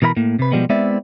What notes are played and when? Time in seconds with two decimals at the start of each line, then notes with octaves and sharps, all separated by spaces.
0.02 B2 E3 A#4 D#5 B5
0.17 A2 A#3
0.39 C3 B4
0.52 B2 D#3 F3 G3 G#3 B3
0.70 G#3 B3 C4 E4 D5 E5